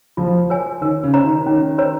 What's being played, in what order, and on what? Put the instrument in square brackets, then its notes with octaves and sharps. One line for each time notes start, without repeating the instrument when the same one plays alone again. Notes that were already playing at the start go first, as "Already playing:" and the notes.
[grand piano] F3 [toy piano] F4
[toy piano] A#4 C#5 G#5
[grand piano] D#3 [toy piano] A#4
[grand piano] C#3
[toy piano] C#5 A#5
[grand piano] D#3
[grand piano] D#3 [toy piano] C#4
[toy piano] A#4 C#5 A#5